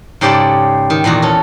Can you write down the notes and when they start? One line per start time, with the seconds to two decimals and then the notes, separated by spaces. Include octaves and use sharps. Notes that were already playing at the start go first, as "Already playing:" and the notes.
0.21 G#2 C#3 G4 A4 D5 A5
0.90 D#3
1.04 E2 A#2 D#3 F#4
1.22 C#4 A4